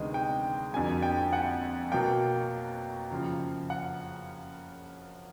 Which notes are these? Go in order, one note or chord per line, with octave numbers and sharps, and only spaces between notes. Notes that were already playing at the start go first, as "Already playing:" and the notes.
Already playing: D2 C3 D#3 G#3 B3 D#5
G5
F2 D3 F#3 A#3 G#5
G5
F#5
B2 F#3 A#3 G5
F#2 C#3 F3
F#5